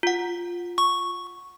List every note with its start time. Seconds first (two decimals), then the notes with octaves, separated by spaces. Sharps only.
0.03 F4 F#5
0.78 C#6